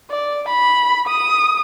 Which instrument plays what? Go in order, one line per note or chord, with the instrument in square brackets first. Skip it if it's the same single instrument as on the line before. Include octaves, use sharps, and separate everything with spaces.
[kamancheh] D5
B5
D#6